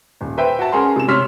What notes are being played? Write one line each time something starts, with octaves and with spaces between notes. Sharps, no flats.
D#1
B4 C5 E5 G5
F#4 A5
C#4 G#4 A#4 C6
C3 E7
C3 C#5 C6 F6 B6